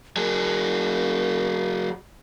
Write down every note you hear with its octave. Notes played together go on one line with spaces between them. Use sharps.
F#3 G#4 A#4